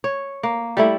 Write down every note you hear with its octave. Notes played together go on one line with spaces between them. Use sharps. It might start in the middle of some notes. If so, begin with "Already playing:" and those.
C#5
A#3
G3 A3 E4